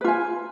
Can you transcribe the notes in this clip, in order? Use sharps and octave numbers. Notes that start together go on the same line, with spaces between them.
F4 B4 G#5